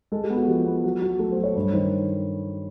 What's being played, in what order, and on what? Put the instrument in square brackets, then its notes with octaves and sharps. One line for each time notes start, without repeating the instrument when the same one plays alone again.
[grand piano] G#3 A4
G4
B3
F#4
F3 G4
B3
F#3
F#3
A3 A4
C5
F#3
C#5
G2 C#5
D#3 C5